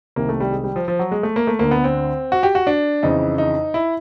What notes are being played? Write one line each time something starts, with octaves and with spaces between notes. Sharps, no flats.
C2 C3 D#3 A#3
A3
G3
G#3
G3
F3
F3
F#3
G#3
A3
A#3
A3
D2 D3 A#3
B3
C4
F#4
G4
F#4
D4
F2 C#3 E3 D#4
D#4
E4